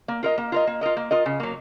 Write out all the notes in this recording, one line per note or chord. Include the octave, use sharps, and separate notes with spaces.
A#3
F4 A#4 D#5
A#3
F4 A#4 D#5
A#3
F4 A#4 D#5
A#3
F4 A#4 D#5
C#3
F#3 A#3